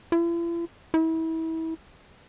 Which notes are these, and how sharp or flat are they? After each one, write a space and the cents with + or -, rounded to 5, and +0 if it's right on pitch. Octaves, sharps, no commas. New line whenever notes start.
E4 +45
E4 -30